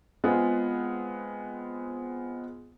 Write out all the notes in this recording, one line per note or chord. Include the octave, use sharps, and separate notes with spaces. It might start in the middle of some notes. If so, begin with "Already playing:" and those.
G#3 B3 C4 F4 G#4